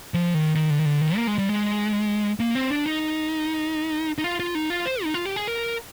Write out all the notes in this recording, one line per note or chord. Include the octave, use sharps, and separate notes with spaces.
F3
D#3
D#3
D3
D#3
D3
D#3
A#3
G#3
G3
G#3
A#3
C4
D4
D#4
D#4
F4
F4
D#4
F4
C5
D#4
F4
G4
G#4
A#4